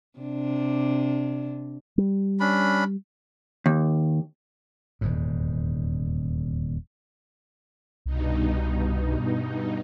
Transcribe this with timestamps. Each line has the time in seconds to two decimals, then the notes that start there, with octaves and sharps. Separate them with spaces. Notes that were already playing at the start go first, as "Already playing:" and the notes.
0.19 C3 D4
1.98 G3
2.40 C#4 D4 B5
3.66 D#2
5.01 D#1 E2 G#2
8.06 C2 G2 B2 D#4